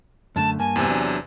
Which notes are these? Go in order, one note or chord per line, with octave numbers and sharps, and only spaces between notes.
F#2 D3 A3 A5
G2 A#3 G#5 A5
E2 C3
F#3 D4